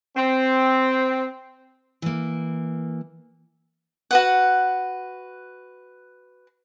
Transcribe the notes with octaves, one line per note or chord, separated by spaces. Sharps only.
C4
E3 A#3
F#4 B4 F#5